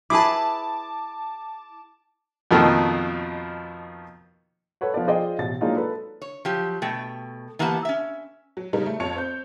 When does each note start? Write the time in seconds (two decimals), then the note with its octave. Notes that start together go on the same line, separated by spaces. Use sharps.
0.10 E4 G#4 B4 A5 D6
2.51 F2 B2 D#3 F3 A3 A#3
4.81 A4 B4 C#5 F#5
4.94 F3 B3 D5
5.07 F4 G#4 C5 D5 D#5 G5
5.38 A1 B2 A6
5.61 F#3 G#3 A#3 D4 D#4 F4
5.76 A4 B4
6.22 C#5
6.45 F3 F#3 G4
6.82 B2 A3 G5
7.59 E3 A#3 B3 G4 F#5 A5
7.85 C#4 E5
8.57 F#3
8.73 C#3 G3 D#4 A#4
8.86 A3
9.00 F2 C#5 C#7 F7
9.16 C4 G6